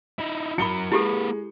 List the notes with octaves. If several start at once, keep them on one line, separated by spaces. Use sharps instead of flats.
D#4 E4
F#3 E4 A#4 B5 C#7 G7
G#3 A#3 E4 G4 A4 B4